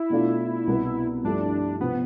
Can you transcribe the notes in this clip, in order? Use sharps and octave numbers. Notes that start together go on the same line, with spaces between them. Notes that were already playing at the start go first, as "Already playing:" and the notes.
Already playing: E4
B2 A3 D4 F4
C2 B2 B3
G2 F3 A3 D4 E4 G4
C3 F3 B3 C4